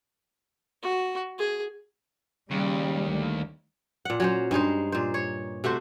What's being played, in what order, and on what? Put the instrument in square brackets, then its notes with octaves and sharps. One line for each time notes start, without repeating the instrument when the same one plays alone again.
[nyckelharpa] F#4
G#4
[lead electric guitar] D#2 [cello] C#3 [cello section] G3
[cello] D2
[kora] A#2 F#5
F#3 C#4 C5
G2 G#3 D#4 C5
A#2 C5
C#5
C3 A3 F#4 C5